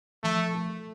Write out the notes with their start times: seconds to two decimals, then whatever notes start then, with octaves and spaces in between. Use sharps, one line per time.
0.23 F3 A3
0.55 A3